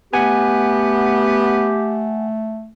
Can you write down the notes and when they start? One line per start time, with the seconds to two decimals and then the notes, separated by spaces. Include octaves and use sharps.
0.13 A3 B3 G4 F#5 G#5